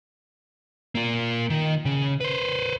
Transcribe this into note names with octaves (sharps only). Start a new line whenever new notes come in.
A#3 F4
D#3
C#3
B4 C5